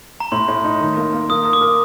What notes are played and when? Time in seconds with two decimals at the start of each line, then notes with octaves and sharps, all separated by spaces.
0.20 A#5
0.32 A2 C6
0.48 A2
0.65 D#4
0.81 D#3
0.97 A#3
1.13 A#3
1.29 A#3 D#6
1.45 A#4
1.53 D6
1.61 A#4